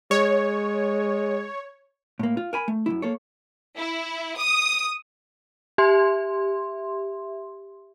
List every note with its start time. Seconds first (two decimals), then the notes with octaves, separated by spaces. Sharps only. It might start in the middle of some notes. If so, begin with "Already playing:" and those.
0.11 G#3 C#5
2.19 A2 A#3
2.37 F4
2.53 A#4 G#5 B5
2.68 A3
2.86 F#2 D#3 E4
3.02 A#3 A4 C#5
3.77 E4
4.38 D#6
5.78 G4 E5 C6